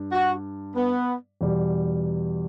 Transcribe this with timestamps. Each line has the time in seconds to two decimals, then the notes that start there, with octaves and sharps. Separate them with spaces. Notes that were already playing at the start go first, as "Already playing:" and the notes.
Already playing: G2
0.12 F#4
0.75 B3
1.41 E2 B2 G3